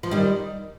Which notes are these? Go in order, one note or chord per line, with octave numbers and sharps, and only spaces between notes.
F3
D#3 G3